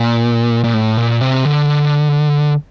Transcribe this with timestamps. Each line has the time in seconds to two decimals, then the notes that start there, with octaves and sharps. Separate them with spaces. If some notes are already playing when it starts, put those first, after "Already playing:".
Already playing: A#2
0.64 A#2
0.74 A2
0.97 A#2
1.21 C3
1.45 D3